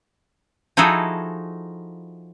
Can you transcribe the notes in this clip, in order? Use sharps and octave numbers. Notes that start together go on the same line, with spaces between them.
F3 D#4 E4 F#4 G#4 A4